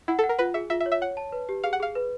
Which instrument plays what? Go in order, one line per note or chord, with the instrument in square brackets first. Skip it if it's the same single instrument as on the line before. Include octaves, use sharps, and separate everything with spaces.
[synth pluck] E4 [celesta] F#5
[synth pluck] A4
[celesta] F#5
[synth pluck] A#4
[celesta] F4 [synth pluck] B4
[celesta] G#4 [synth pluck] E5
[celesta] F4 [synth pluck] E5
[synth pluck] E5
[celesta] C#5
[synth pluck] E5
[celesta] C#5 [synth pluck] F#5
[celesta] A5
B4
G4
[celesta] G#4 [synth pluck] F5
[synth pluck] F#5
[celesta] G#4 [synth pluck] F5
[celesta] B4